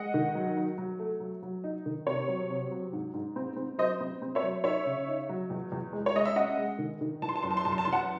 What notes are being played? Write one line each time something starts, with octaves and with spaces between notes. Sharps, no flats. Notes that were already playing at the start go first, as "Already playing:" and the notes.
Already playing: G#3 D#5 F#5
D#3
F#3
F#3
F#3
A3
F#3
F#3
D#4
D#3
C3 C#5
F#3
C3
F#3
G#2
G#2
C4
C4
F#3 C5 D#5
C4
C4
C#5 E5
F#3
D#4 C#5 E5
C#3
D#4
F#3
E2
E2
G#3
C#5
G#3 D#5
E5
C#4 D#5 F#5
G#3
D#3
D#3
E3 A5
C6
A5
F#2 C6
A5
C6
F#2 A5
C6
A5
E3 C6
F#5 A5